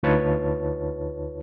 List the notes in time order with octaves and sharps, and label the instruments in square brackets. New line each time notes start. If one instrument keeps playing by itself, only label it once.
[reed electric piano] D2 D#4 F4 B4 C#5 A5